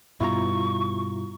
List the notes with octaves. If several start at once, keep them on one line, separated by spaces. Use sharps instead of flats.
G2 B2 E4 F4 A#5 C#6